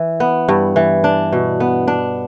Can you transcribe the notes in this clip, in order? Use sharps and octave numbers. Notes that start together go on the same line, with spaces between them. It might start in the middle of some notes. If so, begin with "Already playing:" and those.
Already playing: E3
B3
G2
E3
D4
B2
B3
D4